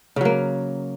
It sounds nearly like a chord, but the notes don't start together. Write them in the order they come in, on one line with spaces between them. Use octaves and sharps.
C#3 F#3 A#3